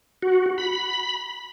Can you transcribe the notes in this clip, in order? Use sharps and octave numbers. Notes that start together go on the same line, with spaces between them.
F#4
B5